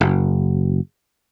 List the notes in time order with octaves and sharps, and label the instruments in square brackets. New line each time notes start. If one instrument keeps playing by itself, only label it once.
[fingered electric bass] F#1